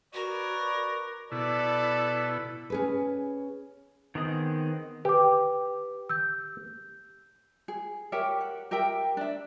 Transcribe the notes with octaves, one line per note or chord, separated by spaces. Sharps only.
F#4 A#4 B4 C#5 D5
B2 E4 A4 D5
C#4 G#4 B4
D#3 B3 C4 G#4 D#5
G4 B4 D6
E6 G6
G#4
G4 A#4 C#5 E5
F#5
G4 A#4 E5 G5
D4 E5